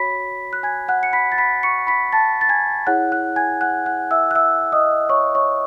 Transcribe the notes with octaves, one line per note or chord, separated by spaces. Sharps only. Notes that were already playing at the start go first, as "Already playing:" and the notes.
Already playing: F#4 C#5 B5 B6
F#6
G#5 G#6
F#5 F#6
C#7
B5 B6
A6
B5 B6
C#6 C#7
B5 B6
A5 A6
A6
G#5 G#6
E4 G#4 C#5 F#5 F#6
F#5 F#6
G#5 G#6
F#5 F#6
F#5 F#6
E5 E6
F#6
E5 E6
D#5 D#6
C#5 C#6
C#5 C#6